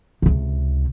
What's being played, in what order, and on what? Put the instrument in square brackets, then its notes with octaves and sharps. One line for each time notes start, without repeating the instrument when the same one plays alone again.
[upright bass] C#2 C3